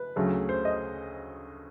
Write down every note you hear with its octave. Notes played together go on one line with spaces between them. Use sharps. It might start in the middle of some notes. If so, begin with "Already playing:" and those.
Already playing: B4
D2 C#3 F#3 A3 C#4
C5
D#5